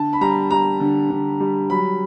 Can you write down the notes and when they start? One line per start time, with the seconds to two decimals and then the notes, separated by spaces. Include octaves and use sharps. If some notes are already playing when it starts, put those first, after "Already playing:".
Already playing: D3 A5
0.13 B5
0.21 G3 A#5
0.51 G3 A#5
0.80 D3
1.10 D3
1.40 G3
1.70 F#3 B5